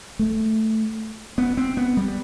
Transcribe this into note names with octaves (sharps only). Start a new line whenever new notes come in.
A3
B3
C4
B3
G3